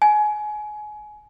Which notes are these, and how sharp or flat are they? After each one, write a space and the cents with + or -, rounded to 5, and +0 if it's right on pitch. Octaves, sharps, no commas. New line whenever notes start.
G#5 +25